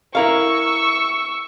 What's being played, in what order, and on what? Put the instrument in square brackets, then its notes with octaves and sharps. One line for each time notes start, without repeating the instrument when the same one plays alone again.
[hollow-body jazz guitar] E4 A#4 F5 [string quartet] C#6 E6